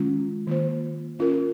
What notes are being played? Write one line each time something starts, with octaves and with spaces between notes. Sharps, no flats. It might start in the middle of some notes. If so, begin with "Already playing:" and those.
Already playing: D#3 G#3 C#4 F4
D#3 A#3 F4 C5
C#4 F4 A#4